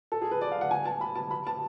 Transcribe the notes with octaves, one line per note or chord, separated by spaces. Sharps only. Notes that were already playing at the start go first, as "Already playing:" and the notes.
A4
G#4
B4
D5
F5
F#5
G#5
A5
B5
A5
B5
A5